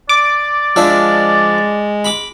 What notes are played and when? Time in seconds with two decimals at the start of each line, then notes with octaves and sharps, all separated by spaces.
0.09 D5 D6
0.76 F3 G#3 D4 E5
2.05 B5 D6